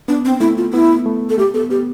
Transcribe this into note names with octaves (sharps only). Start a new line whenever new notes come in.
B3 D4
C4
A3 E4
F4
B3 E4
A3
A4
A3 G4
B3 A4
B3 G4